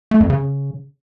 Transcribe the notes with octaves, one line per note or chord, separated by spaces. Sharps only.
A3
F2
C#3